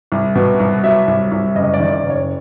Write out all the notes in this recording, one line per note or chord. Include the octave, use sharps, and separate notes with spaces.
C2
B2
C2
F#3 E5
C2
C2
F#1 D#5
D5
D#3
D5
F#1
C#5